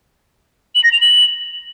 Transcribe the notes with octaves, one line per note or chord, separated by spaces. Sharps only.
F#7
A#6
F7
F#7